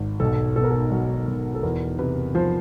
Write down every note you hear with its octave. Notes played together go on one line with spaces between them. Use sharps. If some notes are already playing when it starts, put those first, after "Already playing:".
Already playing: G#1
B1 A4
B2 A4
A#4
A4
F#3
B1
A4
E2 A#4
C3 B4
F3 C5